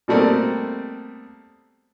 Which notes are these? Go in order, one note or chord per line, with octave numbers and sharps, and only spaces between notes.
B2 G3 A3 A#3 C4